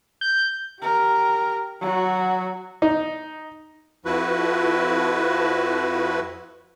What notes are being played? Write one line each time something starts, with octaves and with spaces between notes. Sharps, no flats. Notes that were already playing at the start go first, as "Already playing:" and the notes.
G6
G4 A#4
F#3 F#4
D#4
F2 F3 E4 F#4 B4